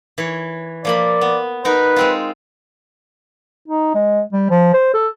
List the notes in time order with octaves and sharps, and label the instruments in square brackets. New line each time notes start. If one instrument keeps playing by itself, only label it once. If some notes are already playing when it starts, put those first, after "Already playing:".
[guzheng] E3 C#5
[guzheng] F3 A#3 B5 [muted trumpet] D5
[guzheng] B3
[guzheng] D#4 F#4 A#4 [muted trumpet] B4
[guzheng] G#3 C4 F4
[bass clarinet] D#4
G#3
G3
F3
C5
A4